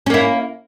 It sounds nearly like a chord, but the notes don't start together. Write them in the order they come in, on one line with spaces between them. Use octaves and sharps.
C#4 A#3 E4